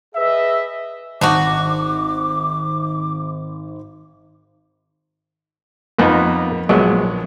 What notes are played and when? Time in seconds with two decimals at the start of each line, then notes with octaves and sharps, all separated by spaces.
0.15 G#4 B4 D#5 E5
1.21 G#1 D4 D#4 F#4 C#6 D6
5.98 F2 A#3 B3 D#4 B4
6.69 A#1 F#3 G#3 B3